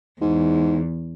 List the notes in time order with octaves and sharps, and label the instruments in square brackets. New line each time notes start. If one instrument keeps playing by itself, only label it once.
[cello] E2 [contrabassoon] G#2